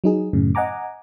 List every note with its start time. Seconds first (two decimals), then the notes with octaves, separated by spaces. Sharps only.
0.04 F#3 D#4 G#4
0.33 F#2 A2 C#3
0.55 D#5 F#5 G#5 A#5 D6